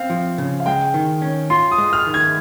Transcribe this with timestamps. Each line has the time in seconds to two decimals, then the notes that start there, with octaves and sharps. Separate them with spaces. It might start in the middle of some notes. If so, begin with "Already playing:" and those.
Already playing: C4 F5
0.10 F3
0.38 C#3
0.60 F5
0.66 G#3 G5
0.94 D#3
1.22 C#4
1.50 F4 C6
1.71 D#6
1.78 G#3
1.93 F6
2.07 D#3
2.14 G#6